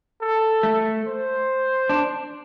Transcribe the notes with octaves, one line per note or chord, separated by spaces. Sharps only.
A4
A3
C5
D4